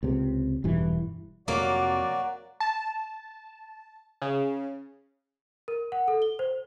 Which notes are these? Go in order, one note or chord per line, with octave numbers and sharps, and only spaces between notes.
C#2 C3
E1 G2 E3
F2 C3 F#3 A#3 F#4 D5
A5
C#3
A#4
F#5
A4
G7
C5